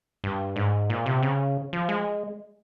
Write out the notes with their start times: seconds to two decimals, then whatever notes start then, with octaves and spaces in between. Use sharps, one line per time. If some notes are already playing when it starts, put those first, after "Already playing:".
0.24 G2
0.56 G#2
0.90 A#2
1.06 C3
1.23 C#3
1.73 F3
1.89 G#3